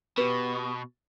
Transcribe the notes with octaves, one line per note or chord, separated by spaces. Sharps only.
B2 G4 B4